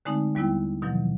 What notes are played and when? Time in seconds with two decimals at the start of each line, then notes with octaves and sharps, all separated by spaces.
0.05 D3 G#3 A3 C4 D#4
0.35 D#2 G3 B3 E4 G5
0.82 B2 D#3 F3 F#3